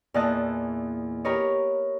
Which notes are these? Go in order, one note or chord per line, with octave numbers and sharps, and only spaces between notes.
E2 A#2 E3 D#5 A5 F#6
G4 A#4 B4 C#5 D#5